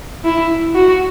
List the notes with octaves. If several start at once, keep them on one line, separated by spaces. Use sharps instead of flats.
E4
F#4